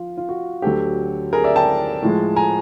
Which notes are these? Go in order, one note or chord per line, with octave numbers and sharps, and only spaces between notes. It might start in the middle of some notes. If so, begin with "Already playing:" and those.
Already playing: F3 F4
F4
F#4
D2 D3 F#3 G4 A4
G#4 A#4
D5 E5
G5 A5
A2 F3 G#3
G#5 A#5